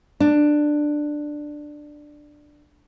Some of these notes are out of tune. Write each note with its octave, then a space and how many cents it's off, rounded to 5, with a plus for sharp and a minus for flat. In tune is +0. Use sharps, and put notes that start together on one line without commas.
D4 +10